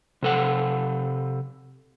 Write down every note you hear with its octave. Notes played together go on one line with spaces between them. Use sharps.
C3 A4 F#5